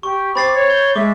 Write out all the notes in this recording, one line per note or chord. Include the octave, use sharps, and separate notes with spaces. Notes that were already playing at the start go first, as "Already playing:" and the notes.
G4 C#6
C4 B5 D6 A6 C7
C#5
G6
G#3 E5 D6